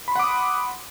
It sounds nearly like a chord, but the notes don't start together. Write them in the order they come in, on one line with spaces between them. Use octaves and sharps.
B5 C6 F#5 D6 D#6